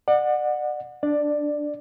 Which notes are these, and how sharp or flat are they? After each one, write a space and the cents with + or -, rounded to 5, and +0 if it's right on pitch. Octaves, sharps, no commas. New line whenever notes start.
D5 +35 F#5 -15
D4 +0 D5 +10